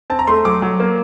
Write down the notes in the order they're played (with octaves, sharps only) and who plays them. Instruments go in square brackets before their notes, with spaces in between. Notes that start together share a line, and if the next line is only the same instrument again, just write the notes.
[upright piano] C4 A5
A#5
A3 C6
F#3 D6
F#3
A#3